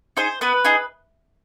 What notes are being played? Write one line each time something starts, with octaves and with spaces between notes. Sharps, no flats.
D#4 G#4 C5
B3 B4
D#4 G#4